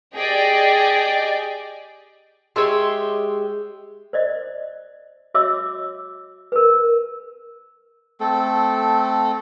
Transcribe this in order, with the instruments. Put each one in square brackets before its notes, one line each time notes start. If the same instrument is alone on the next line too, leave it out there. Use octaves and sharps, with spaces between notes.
[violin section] G4 G#4 D5 D#5 G5
[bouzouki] G#3 G4 [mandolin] C#5 E5 C6
[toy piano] C5 D5 D#5
F#4 C#5 D#5 E5 D6 E6
A#4 B4
[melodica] A3 C4 A4